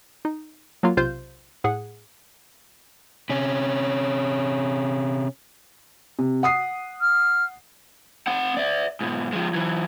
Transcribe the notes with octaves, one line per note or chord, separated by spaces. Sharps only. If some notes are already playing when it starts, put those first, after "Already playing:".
D#4
F#3 A#3 F4
B1 C3 F4 C5 G6
A2 G#4 F#5
C3 C#4
C3
F#5 D#6 C7
F6
C4 F#5
D5 E5
G#2 B2
F3 G#3
E3 F#3